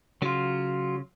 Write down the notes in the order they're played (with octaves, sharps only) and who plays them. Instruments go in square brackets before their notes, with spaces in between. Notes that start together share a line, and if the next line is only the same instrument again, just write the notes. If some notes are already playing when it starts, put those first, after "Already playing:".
[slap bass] C#3 [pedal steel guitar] F#3 F4